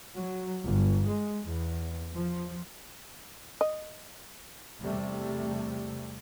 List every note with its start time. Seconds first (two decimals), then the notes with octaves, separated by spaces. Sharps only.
0.16 F#3
0.64 G1
1.06 G#3
1.46 E2
2.15 F3
3.61 D#5
4.81 E2 C3 G3 A3